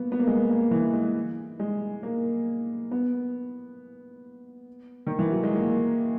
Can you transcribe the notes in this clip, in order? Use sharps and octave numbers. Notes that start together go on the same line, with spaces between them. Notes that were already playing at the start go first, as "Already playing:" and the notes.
Already playing: A#3 B3
B3
A#3
G#3
A#3
E3
G#3
G#3
A#3
B3
D#3
E3
F#3
G#3
A#3